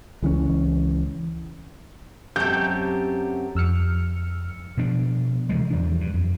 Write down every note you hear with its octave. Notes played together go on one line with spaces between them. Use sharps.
C#2 E3 F#3 C#4
F#2 C3 F#3 F#4 G4 A4 G6
F2 E6 F6 C#7
B2 F3 D4
C3 E3 F3 G#3
E2 F3 D4
G2
F2